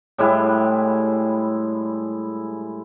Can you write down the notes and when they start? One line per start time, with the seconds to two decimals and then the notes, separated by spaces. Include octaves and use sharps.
0.18 A2 G3 G#3 E4